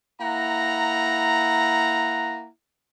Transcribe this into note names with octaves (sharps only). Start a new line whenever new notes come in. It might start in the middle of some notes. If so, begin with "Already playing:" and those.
A#3 E4 F#5 A#5